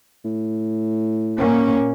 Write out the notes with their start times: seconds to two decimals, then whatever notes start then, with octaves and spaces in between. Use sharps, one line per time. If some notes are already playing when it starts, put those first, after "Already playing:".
0.25 A2
1.38 A#2 A#3 C#4